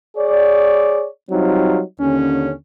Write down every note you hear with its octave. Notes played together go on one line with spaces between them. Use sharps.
G#4 C#5 D5
F#3 G3 C4 D#4 F4
D#2 D3 C#4